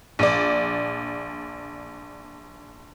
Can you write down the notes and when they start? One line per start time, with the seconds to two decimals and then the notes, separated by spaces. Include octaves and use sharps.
0.19 A#1 D5